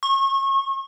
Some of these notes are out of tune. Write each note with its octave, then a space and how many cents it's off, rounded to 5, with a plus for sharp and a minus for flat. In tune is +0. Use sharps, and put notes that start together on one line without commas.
C#6 -30